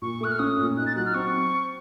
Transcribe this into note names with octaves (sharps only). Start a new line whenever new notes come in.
A#2 C#6
A3 F#6
F6
C#4 D#6
A#2
D#4 F#6
A6
F#3 F#6
F6
C4 C#6